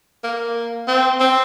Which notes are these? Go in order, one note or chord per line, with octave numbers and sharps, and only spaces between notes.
A#3
C4
C4